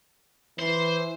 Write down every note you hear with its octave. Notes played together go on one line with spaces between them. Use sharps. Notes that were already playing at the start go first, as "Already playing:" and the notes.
E3 C5